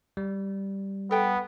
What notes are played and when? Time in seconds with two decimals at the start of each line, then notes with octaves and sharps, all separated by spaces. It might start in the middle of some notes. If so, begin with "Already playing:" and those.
0.17 G3
1.11 B3 A4 G5